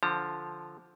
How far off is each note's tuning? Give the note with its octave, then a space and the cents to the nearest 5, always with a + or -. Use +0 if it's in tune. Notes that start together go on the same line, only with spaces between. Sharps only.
D3 -5 F3 +0 A#5 -30